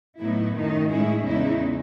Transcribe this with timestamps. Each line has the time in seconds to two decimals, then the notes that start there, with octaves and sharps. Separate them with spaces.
0.18 A2 F#3 B3 D#4 E4
0.54 F#2 D#3 A3 D#4
0.89 A2 G#3 C#4 E4 G#4
1.25 E2 C#3 G#3 D#4 E4